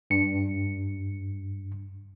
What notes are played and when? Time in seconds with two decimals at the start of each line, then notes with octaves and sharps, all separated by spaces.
0.10 G2 C#7